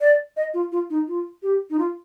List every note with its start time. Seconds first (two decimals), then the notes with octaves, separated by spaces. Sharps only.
0.01 D5
0.37 D#5
0.54 F4
0.72 F4
0.90 D#4
1.08 F4
1.43 G4
1.70 D#4
1.79 F4